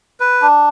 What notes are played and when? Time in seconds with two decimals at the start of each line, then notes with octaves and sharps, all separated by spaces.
0.20 B4
0.42 D4